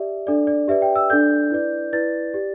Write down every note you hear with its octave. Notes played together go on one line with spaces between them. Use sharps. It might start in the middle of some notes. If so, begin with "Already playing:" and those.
Already playing: G4 D5 E5
D4 A4 D5
D5
G4 B4 D5 E5
G5
E6
D4 A4 D5 G6
E4 B4 D5
E4 B4 D5 A6
G4 D5